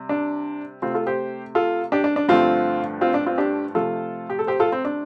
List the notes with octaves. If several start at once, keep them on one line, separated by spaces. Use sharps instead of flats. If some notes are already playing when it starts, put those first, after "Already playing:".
Already playing: C3 G3
D4
C3 A3 C4 F4
F4 A4
G4 C5
F4 A4
D4 G4
D4
D4
G2 D3 F3 A3 C4 F4
C4 F4
D4
C4 F4
D4 G4
C3 F3 A3 F4 A4
G4
A4
G4 C5
F4 A4
C4
D4